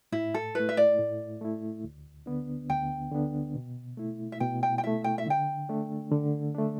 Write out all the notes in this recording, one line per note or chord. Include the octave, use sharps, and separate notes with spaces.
A2 E4
A4
A3 E4 B4
E5
D5
A2
A3 E4
D2
D3 B3 D4
D2 G5
D3 B3 D4
B2
A3 E4
E5
B2 G5
G5
G5
A3 E4 E5
G5
E5
D3 G5
A3 D4
D3
A3 D4